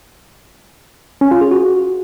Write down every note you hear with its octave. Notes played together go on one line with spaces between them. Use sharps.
C#4
F4
G#4
F#4